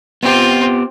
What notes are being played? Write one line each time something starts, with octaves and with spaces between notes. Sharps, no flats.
B3 C4 F4 G4